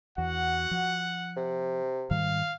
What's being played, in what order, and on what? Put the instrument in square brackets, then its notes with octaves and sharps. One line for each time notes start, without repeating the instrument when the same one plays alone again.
[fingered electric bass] E2 [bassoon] F#4 [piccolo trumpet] F#5
[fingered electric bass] F3
[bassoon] C3
[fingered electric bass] G#2 D#3 G3 [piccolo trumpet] F5